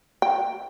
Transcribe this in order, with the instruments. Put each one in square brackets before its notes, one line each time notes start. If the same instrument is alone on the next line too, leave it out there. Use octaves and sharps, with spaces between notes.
[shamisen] G5